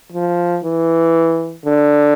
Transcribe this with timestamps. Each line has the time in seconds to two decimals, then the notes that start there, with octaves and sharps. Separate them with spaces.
0.12 F3
0.64 E3
1.65 D3